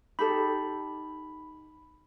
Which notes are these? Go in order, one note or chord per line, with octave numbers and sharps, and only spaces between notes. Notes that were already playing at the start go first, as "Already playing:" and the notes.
D#4 G4 A4 B5